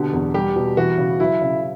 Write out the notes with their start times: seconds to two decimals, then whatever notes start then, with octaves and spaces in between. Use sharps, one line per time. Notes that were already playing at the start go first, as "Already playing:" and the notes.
Already playing: B2 D3 G4
0.13 E2
0.34 G3 G4
0.56 B2
0.77 E3 F#4
0.98 C#3
1.20 F#3 E4
1.41 C#3